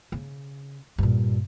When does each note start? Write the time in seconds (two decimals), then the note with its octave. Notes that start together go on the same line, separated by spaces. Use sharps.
0.12 C#3
0.98 G2 A#2